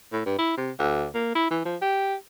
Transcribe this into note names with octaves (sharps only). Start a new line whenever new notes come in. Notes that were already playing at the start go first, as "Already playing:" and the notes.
A2
G2
E4
C3
D2
A#3
E4
E3
F3
G4